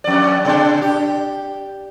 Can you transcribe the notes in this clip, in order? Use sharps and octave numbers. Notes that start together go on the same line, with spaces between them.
F2 D5
B2 D3 D4
G4